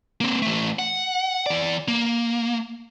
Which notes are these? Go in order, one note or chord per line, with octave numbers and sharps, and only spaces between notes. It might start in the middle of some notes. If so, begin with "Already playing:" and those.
A#3 C4
E3 A3
F#5
E3 D5
A#3